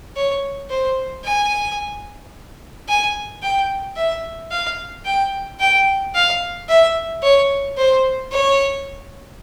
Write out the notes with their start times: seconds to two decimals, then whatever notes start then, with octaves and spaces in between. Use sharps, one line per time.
0.16 C#5
0.70 C5
1.24 G#5
2.88 G#5
3.43 G5
3.96 E5
4.51 F5
5.05 G5
5.60 G5
6.15 F5
6.69 E5
7.23 C#5
7.77 C5
8.32 C#5